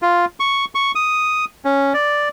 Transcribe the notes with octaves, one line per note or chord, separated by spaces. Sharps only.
F4
C#6
C#6
D#6
C#4
D5